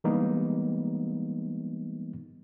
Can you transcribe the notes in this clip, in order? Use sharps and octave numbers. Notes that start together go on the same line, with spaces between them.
E3 G3 G#3 A#3 B3 D#4